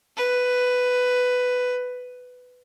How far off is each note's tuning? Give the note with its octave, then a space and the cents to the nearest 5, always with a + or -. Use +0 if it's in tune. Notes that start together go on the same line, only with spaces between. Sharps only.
B4 +10